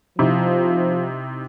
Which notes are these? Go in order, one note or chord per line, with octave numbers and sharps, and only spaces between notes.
C3 F3 D#4 E4